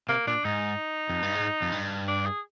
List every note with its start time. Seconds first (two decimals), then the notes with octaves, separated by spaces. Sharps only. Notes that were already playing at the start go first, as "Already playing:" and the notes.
0.09 C3 A#3
0.27 A#2 D4
0.45 G#2 D#4
1.09 F2
1.22 G2
1.35 G#2
1.62 F2
1.72 G2
2.08 D4
2.25 G#4